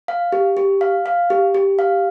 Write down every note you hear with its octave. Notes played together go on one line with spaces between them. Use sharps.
F5
G4
G4
F5
F5
G4
G4
F5